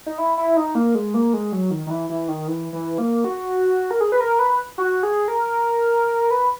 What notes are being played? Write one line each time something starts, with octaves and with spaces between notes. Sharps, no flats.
D#4
E4
E4
D#4
A#3
G#3
A#3
G#3
F#3
D#3
D#3
E3
E3
D#3
E3
E3
A#3
F#4
A#4
G#4
B4
A#4
B4
F#4
G#4
A#4
B4